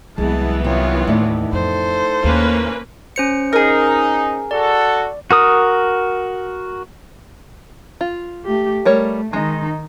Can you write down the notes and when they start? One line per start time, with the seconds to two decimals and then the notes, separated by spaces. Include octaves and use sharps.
0.18 C2 E3 F#3 G#3 B3 A5
0.64 C3 D#3 F4 C#5
1.07 D#2 A2 D#4 D5
1.53 F2 A4 C5
2.24 D#2 A#3 C#4 B4
3.16 C#4 C5 C#7
3.53 D#4 G#4 A#4
4.51 F#4 A4 D5
5.31 F#4 A#4 D#6
8.01 F4
8.45 A3 G4
8.85 G3 A3 A#4 C#5
9.33 D#3 G#3 D#4